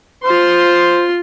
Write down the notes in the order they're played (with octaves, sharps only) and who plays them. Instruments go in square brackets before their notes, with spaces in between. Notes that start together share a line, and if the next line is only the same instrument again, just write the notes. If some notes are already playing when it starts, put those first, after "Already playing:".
[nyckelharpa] F4 C6 [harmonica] C5